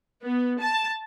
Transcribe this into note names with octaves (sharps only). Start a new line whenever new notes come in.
B3
A5